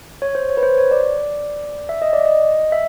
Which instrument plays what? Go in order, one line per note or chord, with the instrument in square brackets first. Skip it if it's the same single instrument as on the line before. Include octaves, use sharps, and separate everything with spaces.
[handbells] C#5
C5
C#5
B4
C5
C#5
D5
E5
D#5
D5
D#5
E5